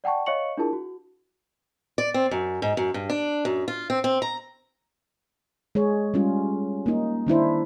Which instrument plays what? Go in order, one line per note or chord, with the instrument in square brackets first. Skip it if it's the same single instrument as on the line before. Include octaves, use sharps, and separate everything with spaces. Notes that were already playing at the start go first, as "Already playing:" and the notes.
[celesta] D5 F#5 G5 A5 C#6
C#5 D#5 F5 C#6 C#7 F#7
D4 E4 F4 G#4 A#4 A5
F#4
[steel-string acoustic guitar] D5
C4
F#2
G#2
F#2
G2
D4
F#2
F4
C4
C4
A#5
[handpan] G#3 G#4 C#5
G3 C#4 F4
A#3 D#4
D#3 D4 E4 C5